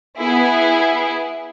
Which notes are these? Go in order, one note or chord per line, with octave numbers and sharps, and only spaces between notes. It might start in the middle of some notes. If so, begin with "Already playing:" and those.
B3 E4 G#4